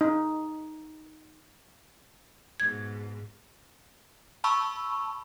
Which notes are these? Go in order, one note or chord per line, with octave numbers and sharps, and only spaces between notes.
D#4
G#2 B2 G#6
A5 B5 C#6 E6